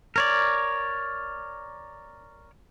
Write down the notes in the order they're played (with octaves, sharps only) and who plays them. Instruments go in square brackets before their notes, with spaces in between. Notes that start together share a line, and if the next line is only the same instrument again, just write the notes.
[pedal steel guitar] A#4 C#5 D5